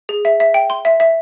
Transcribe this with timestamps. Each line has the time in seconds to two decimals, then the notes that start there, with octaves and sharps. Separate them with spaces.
0.09 G#4
0.25 E5
0.40 E5
0.54 G5
0.70 C6
0.85 E5
1.00 E5